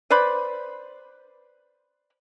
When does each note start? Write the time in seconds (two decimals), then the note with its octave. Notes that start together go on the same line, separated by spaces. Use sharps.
0.10 B4 C5 D5 B5